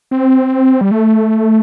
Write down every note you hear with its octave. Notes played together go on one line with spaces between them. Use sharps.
C4
G3
A3